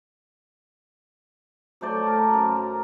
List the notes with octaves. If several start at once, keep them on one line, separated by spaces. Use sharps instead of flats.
F#3 A3 C5 D5
A#4
F#2
A#5